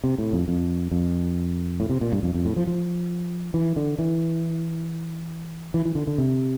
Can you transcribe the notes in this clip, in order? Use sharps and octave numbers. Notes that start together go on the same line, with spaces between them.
C3
A2
F2
F2
F2
A2
C3
A#2
G2
F2
F2
A2
F3
F3
E3
D3
E3
E3
E3
D3
D3
C3